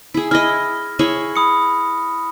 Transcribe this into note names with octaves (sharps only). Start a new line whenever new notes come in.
E4 G#4
E4 D#5 F6 A#6
E4 G#4 C#5
B5 D#6 C#7